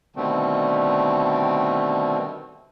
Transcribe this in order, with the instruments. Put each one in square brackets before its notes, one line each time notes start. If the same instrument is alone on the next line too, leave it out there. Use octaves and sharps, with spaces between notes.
[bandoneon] B2 D3 D#3 G3 A3 C4